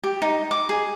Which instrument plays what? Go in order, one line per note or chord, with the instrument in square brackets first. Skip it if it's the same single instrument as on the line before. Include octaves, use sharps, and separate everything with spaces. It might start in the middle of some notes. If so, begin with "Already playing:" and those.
[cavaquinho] G4
D#4
D6
G#4